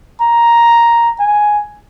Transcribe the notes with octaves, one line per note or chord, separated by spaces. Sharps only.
A#5
G#5